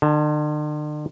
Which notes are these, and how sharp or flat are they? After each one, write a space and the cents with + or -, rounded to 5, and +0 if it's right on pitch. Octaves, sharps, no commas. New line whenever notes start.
D3 +45 A5 +0